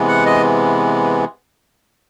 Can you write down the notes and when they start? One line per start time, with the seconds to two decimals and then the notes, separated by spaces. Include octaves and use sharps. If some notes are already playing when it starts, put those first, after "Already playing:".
Already playing: C3 E3 G#3 B3
0.08 F#5
0.26 D#5